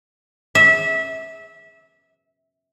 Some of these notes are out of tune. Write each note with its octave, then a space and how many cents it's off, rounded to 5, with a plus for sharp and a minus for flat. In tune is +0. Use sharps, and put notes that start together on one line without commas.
E5 -20